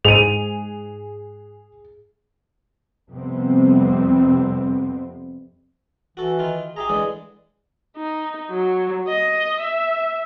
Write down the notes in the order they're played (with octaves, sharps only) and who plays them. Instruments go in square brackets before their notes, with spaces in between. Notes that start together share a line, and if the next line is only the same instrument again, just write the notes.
[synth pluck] G#2 [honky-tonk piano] G#4 [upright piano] D#7 F7
[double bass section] F2 C3 G3 B3 C4
[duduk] E3 [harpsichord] F#4 A4
[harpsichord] D#3 F4
[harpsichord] G4 E5 A#5 [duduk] G#4
[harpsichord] D3 E3 G#3
[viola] D#4
F#3
D#5
E5